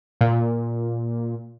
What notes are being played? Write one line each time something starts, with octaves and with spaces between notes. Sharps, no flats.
A#2